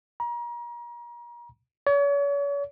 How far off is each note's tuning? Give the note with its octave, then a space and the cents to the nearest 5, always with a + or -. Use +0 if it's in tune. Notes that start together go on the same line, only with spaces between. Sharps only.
A#5 +35
C#5 +40